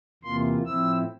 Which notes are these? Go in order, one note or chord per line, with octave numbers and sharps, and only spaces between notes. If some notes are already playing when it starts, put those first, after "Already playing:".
E2 C3 E3 A#3 F4 C6
A2 F3 C4 E4 E6